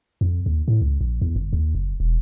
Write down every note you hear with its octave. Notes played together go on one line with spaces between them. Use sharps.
F2
D#2
A2
C#2
A#1
E2
G1
D#2
F#1
E1